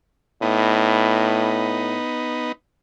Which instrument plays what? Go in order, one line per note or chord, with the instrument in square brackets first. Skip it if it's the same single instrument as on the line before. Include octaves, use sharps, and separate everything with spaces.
[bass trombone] A2 [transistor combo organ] B3 D#4